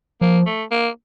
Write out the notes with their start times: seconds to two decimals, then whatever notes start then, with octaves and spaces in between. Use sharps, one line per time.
0.21 F3 A#3
0.46 A3
0.71 A#3